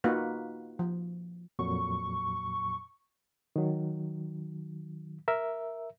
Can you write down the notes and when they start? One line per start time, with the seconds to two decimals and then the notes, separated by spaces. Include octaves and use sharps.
0.04 A#3 D#4 F4 F#4 B4
0.79 F3
1.59 F2 A#2 F#3 C#6
3.56 D#3 F#3
5.28 A#4 E5